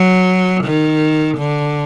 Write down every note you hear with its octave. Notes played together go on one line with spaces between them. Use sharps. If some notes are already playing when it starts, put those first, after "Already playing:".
Already playing: F#3
D#3
D3